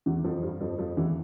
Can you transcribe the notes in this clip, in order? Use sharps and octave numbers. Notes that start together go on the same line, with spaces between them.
E2 E3
F2 F3
G2 G3
F2 F3
F2 F3
E2 E3